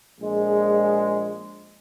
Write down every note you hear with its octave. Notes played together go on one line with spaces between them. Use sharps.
A#1 G#3